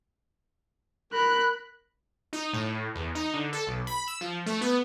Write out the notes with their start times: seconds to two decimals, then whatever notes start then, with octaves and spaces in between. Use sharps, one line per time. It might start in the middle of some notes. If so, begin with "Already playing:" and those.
1.13 A#4 B5 F#6
2.33 D#4
2.53 A2
2.95 E2
3.15 D#4
3.34 D3
3.53 A4
3.67 B1
3.87 B5
4.07 E6
4.21 F3
4.46 A3
4.61 B3